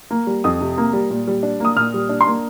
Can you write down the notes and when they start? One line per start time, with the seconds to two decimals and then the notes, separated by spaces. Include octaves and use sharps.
0.11 A#3
0.27 G3
0.44 F2 D#6
0.61 C3
0.78 A#3
0.93 G3
1.10 A#2
1.27 G3
1.43 D4
1.60 A#3 D#6
1.76 A#2 F6
1.94 G3
2.09 D4
2.21 C6
2.27 A#3